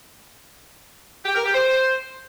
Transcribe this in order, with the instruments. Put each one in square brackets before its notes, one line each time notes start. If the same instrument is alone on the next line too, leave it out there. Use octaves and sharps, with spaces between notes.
[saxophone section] G4
A#4
G4
C5